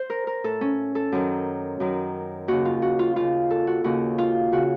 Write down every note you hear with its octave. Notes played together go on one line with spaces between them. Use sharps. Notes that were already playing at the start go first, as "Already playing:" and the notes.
Already playing: C5
A#4
A#4
A2 A4
C#4
A4
F#2 D#3
F#2 D#3
D#2 C#3 F#4
F4
F#4
F4
D#2 C#3 F4
A4
F#4
D#2 C#3 F#4
F4
C#3 F#4